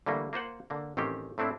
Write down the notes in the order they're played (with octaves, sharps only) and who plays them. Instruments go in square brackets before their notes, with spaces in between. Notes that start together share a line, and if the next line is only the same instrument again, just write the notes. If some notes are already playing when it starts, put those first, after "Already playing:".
[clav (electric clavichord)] D3 E3 G3 A3 A#3
A#3 F4 C5 F#5
D3 A#3
A1 D#3 C4 C#4 G4
A2 A3 C4 D4 E4